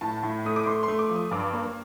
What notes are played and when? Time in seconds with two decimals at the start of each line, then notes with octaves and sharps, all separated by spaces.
0.01 A2 A5
0.23 A2
0.45 A3 D#6
0.56 D6
0.66 A3 C6
0.83 C6
0.88 A3
0.99 D6
1.10 F3
1.15 D#6
1.31 G2 D6
1.53 A#3